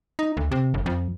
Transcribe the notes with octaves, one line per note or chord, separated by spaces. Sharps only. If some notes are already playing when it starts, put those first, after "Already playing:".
D#4
D2
C3
G1
F2